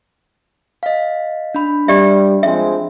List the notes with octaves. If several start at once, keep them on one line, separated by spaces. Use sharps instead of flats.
D#5 F5
D4 B5
G3 G4 D5 E5
F3 G#3 C4 E5